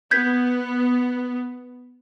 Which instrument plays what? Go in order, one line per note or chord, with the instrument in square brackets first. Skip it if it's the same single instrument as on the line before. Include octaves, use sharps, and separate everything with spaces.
[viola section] B3 [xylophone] G6 G#6 B6